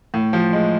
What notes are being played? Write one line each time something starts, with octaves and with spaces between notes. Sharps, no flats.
A2
F3
G#3